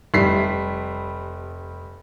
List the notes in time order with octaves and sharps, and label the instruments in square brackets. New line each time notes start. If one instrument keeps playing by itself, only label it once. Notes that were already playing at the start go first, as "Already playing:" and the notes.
[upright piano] F1 G3 E5 B6 C7